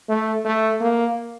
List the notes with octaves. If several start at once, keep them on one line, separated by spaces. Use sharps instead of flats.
A3
A3
A#3